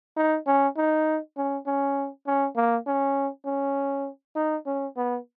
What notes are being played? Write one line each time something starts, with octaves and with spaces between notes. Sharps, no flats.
D#4
C#4
D#4
C#4
C#4
C#4
A#3
C#4
C#4
D#4
C#4
B3